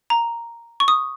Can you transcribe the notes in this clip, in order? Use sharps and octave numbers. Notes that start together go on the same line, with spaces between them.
A#5
C#6
D#6